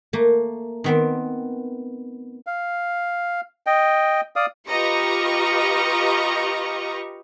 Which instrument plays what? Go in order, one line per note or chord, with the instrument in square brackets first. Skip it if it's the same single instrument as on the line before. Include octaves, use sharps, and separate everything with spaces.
[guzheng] A3 A#3
D#3 B3 C4
[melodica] F5
D#5 G5
D5 F5 D#6
[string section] F4 G4 B4 D#5 A#5 C#6